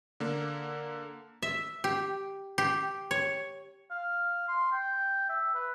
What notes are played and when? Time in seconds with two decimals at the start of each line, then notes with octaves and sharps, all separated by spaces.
0.20 D3 A#3
1.42 E5
1.84 G4
2.58 G4
3.11 C#5
3.91 F5
4.48 C6
4.72 G5
5.29 E5
5.55 B4